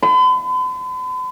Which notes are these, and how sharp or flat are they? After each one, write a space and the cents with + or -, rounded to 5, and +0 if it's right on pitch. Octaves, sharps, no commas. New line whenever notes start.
B5 +45